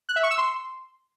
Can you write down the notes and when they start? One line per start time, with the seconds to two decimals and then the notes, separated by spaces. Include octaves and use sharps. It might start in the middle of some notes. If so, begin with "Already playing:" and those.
0.09 F#6
0.16 E5
0.23 C#6
0.31 E6
0.38 C6